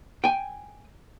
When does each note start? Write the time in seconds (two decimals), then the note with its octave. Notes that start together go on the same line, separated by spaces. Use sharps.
0.24 G5 G#5